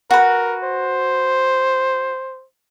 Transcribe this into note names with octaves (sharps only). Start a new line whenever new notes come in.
F#4 A#4 B4
C5